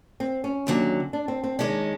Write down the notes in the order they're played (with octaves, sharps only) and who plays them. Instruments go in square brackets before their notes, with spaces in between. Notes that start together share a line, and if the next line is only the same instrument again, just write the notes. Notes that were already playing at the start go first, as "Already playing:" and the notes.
[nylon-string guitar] C4
C#4
[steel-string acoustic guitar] D#2 D3 F#3
[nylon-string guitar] D4
C4
C4
[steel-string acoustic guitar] D#3 G#3 C#4 [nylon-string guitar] D4